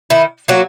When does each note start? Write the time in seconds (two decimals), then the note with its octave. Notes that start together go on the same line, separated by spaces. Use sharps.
0.10 D#3 E4
0.48 F#3 A#3 F#4